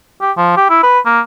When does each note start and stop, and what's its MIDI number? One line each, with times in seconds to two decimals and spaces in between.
0.21 0.32 67
0.37 0.54 53
0.57 0.65 67
0.70 0.82 64
0.83 1.00 71
1.06 1.21 58